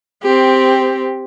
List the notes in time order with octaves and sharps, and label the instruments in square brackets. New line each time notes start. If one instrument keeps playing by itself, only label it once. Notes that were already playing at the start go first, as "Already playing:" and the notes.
[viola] C4 G4